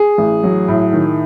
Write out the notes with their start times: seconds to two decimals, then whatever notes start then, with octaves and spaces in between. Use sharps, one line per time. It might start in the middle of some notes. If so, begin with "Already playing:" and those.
Already playing: G#4
0.18 A1
0.43 F#3
0.68 A2
0.92 D#3